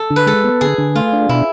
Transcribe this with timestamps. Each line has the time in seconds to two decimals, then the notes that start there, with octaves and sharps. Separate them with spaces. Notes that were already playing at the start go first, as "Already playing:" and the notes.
Already playing: A4
0.10 D3
0.16 B4
0.26 G#3 A4
0.44 B3
0.61 D3 G#4
0.78 D3
0.95 A3 F4
1.13 D4
1.29 B2 E4